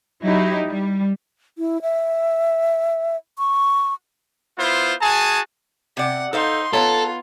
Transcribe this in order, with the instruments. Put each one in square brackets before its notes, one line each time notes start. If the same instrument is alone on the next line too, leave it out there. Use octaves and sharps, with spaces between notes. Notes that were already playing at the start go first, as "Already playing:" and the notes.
[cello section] F#3 D#4 E4 G4
G3
[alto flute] E4
E5
C#6
[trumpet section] B3 E4 F4 C5
F#4 G#4 G#5 A5
[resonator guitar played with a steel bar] C3 D5 [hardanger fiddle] F#5
[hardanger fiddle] D#4 C6 [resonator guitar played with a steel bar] A4 C5 F5
[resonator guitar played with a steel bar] B3 C#5 A#5 [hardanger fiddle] F4 [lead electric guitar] A4